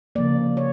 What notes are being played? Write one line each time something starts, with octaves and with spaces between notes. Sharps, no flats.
C#3 F3 A#3 D5
C#5